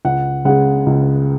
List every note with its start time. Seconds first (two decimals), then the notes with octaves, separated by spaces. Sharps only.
0.05 C#2 F#5
0.45 C#3 G#3 F#5
0.86 C#2